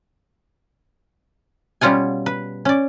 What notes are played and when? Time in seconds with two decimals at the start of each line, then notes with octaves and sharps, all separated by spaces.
1.81 B2 G3 C#4 F4 F#5 G#5
2.26 B4
2.65 C#4 D5